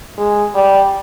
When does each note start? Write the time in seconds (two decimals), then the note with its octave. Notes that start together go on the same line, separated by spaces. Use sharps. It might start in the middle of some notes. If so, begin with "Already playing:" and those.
0.18 G#3
0.55 G3